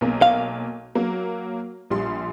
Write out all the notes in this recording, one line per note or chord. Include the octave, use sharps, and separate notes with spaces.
B1 A#3
F5
F#3 A#3
A#1 G3 C6